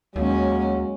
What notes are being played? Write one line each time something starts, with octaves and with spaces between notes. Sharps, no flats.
D#2 F#3 G#3 A#3 C#4